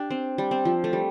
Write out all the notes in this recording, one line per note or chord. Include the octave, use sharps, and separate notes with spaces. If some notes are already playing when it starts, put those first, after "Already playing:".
Already playing: D4 G4
C4
G3
C4
F3
A3
G3